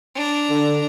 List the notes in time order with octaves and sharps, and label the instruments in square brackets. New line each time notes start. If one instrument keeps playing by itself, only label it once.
[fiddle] D4 A#5
[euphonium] D3